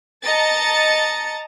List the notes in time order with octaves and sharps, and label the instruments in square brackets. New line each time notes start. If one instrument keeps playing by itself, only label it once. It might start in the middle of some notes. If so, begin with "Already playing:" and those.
[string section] D#5 A5 A#5 A6 C#7